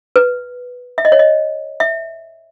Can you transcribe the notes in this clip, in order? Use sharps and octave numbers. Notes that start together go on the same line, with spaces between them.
B4
E5
D#5
C#5
D#5
E5